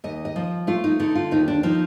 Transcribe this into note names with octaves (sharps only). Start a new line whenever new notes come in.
D#2 D#5
D#5
F3
A3 F4
D#4
D3 D#4
F4
D#2 D#4
D4
F3 D#4